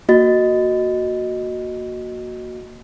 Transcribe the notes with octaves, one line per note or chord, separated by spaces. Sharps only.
A#3 F#4 D#5 A6